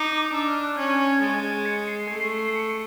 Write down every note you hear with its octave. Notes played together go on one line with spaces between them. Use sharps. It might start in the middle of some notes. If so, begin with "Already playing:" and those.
Already playing: D#4 D6
D4 E6
F6
F#6
C#4 G#6
G#3 A6
G#6
C#7
C7
A3
C#7